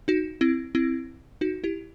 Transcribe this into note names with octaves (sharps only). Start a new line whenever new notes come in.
D#4 F#4
C4 E4
C4 E4
D#4 F#4
E4 G4